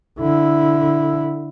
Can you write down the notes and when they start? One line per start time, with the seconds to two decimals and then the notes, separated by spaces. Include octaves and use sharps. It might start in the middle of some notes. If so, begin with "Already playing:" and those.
0.20 D3 E4